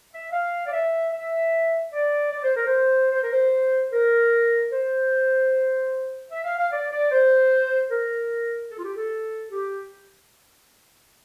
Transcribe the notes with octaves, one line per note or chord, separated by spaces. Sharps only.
E5
F5
D5
E5
E5
D5
D5
C5
A#4
C5
C5
A#4
C5
A#4
C5
E5
F5
F5
D5
D5
C5
A#4
A4
F4
G4
A4
G4